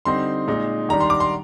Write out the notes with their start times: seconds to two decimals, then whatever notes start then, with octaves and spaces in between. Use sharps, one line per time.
0.05 D3 G3 C4 D#4 C6
0.48 A#2 G#3 D#4
0.89 D#3 G3 D4 A#5
1.00 C6
1.10 D6
1.20 C6